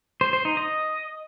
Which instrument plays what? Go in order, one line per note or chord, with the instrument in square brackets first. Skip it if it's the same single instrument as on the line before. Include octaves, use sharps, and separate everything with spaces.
[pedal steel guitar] C5
C5
D#4
D#5